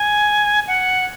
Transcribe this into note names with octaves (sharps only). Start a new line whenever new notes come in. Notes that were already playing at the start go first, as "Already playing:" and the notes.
Already playing: G#5
F#5